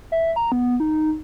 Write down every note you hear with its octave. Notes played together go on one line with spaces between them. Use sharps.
E5
A#5
B3
D#4